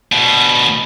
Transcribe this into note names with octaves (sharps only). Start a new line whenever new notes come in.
D2 B2